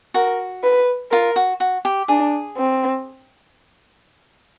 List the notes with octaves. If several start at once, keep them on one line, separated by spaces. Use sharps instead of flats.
F#4 A#4
B4
F4 A#4
F#4
F#4
G4
D4 G#4
C4